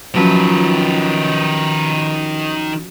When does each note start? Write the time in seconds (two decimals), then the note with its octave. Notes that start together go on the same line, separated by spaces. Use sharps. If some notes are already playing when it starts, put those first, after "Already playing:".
0.15 D#3 F3 F#3 C#4 B4